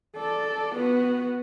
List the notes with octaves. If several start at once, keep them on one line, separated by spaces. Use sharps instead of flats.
A4 D5
B3 F#4